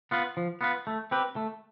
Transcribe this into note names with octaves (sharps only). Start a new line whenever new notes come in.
B3 F4 B4
F3
B3 F4 B4
A3
C4 G4 B4
A3